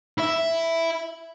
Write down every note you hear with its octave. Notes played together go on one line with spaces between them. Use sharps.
E4 E5